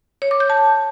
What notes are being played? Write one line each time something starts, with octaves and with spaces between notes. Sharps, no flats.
C#5
D6
G6
A5